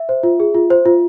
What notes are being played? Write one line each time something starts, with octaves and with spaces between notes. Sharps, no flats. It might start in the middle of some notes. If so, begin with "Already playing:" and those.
Already playing: E5
C5
F4
G#4
F4
C5
F4